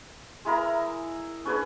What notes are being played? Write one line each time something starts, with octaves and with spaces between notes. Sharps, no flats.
G#3 E4 A#4 A#5
C#4 D4 G#4 B4